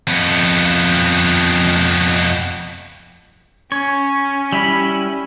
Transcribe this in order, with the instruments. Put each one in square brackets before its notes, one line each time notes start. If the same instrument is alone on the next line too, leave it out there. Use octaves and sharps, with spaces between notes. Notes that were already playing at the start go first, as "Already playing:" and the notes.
[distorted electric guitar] F2 B3
[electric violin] C#4 [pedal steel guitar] C#5
[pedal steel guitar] G3 E4 B5